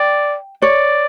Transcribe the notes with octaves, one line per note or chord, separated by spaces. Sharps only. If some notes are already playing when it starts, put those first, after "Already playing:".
Already playing: D5 G5
C#5 D5